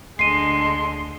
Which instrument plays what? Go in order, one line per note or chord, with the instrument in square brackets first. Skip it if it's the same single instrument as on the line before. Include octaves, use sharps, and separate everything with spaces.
[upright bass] D2 [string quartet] D3 G#3 [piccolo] C6 [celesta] C7 D#7